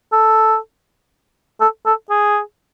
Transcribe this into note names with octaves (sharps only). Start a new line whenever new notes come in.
A4
A4
A4
G#4